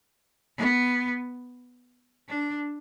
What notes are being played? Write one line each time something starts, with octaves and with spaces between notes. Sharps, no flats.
B3
D4